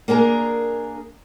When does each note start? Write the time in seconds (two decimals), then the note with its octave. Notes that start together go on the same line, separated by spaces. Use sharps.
0.08 A#3 D4 G#4 A#4